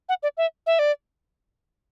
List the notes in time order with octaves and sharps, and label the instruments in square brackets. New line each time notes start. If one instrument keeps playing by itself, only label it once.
[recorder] F#5
D5
E5
E5
D5